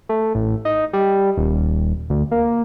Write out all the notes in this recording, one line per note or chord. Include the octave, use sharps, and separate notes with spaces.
A3
A1
D#4
G3
D#1
D2
A#3